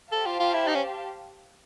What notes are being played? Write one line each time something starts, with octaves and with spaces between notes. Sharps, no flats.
G4 A4 C5 F5 A5
F4
F4
E4
D#4
C#4